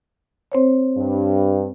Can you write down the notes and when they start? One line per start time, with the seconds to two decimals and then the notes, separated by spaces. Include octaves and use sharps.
0.52 C4 C5 C#5
0.97 G2